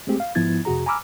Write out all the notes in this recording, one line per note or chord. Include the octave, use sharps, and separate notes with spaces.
G#3 A3 C4 G4 G#4
F5
G#2 F3 B3 E4 G#6 A6
F2 C3 F#4 G#4 A#5
G#5 A#5 B5 D6 E6 F6